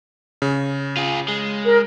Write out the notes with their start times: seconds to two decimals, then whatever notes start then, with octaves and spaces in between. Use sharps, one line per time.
0.42 C#3
0.97 F4 G#4
1.28 G#3
1.65 A#4